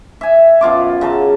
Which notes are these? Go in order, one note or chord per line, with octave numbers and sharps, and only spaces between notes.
E5 G#5
F#2 B2 F4 D6
C#3 F#3 A5